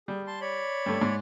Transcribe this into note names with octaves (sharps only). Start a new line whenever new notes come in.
G3 G#4
A5 C6
C#5 D5 B5
G2 A3
G#2